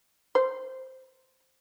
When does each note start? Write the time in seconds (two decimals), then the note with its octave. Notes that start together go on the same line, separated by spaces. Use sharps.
0.35 C5